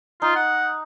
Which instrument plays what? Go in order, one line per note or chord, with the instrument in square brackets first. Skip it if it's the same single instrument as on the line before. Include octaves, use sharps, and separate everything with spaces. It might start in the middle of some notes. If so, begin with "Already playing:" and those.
[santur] D#4 [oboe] F4
[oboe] F#5